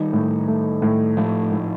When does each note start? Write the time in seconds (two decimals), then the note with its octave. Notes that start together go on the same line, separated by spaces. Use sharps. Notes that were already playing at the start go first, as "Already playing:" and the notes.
Already playing: D#3 G3 D#4
0.13 A2
0.48 A3
0.82 A2
1.17 A2 F3 A3
1.52 A2